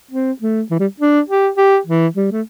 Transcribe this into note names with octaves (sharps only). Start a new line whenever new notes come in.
C4
A3
E3
G3
D4
G4
G4
E3
G3
A3